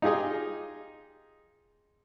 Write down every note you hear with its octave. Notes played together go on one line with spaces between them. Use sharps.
D#4 F4 G4 G#4 D#5